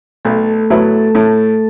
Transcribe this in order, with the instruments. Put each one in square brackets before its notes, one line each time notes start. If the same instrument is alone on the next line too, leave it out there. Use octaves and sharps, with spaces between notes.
[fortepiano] B1 [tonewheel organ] A3 A4
[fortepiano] A2 F#3 B3 E4
A2